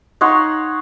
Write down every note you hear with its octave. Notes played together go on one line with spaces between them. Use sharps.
D#4 C#5 F#5 C6